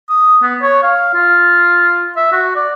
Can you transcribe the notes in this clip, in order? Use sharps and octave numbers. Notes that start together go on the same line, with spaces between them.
D#6
B3
C#5
F5
F4
E5
F#4
D5